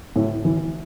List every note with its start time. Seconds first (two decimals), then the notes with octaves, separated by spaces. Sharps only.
0.16 A2
0.45 E3